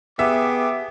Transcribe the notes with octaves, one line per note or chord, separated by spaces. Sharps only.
B3 G4 G#4 E5 D6